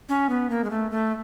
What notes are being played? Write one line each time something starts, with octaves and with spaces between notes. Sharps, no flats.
C#4
B3
A#3
G#3
A3
A3